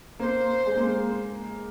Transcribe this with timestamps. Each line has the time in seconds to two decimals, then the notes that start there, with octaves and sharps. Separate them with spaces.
0.19 A#3 C5
0.66 G#3
0.77 A#3